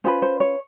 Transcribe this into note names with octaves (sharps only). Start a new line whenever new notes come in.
C#4 F4 G#4 B4 C5
C5
C#5